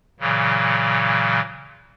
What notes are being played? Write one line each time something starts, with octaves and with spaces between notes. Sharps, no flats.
A#2 C#3 E3 F#3